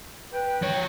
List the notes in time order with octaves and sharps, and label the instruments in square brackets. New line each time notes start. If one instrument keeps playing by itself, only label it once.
[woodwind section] B4 G5
[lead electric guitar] F3 C#5